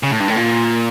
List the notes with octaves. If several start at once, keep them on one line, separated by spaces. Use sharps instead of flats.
C#3
A2
G2
A2
A#2